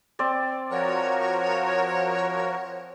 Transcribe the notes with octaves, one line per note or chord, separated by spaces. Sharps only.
C4 D5
F3 F#4 A#4 C#5